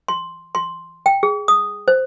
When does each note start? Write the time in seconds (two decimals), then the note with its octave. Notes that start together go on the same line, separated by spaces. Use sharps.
0.08 C6
0.55 C6
1.06 G5
1.23 G#4
1.48 D#6
1.88 C5